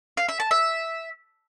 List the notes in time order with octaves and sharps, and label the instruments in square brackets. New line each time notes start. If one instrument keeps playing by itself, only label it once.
[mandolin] F5
E5
A5
E5